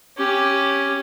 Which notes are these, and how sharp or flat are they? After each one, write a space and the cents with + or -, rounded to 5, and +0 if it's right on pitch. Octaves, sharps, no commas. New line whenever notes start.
C#4 +0 G4 +0